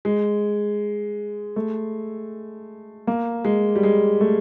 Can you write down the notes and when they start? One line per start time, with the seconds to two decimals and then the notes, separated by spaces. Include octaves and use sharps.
0.05 G#3
1.56 A3
3.07 A#3
3.45 G#3
3.76 G3
3.83 G#3
4.21 A3